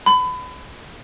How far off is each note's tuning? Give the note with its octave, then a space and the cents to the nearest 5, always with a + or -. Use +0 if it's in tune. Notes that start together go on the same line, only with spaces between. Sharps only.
B5 +30